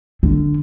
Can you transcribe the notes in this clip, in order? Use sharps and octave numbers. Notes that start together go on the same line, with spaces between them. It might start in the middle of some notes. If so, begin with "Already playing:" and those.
D3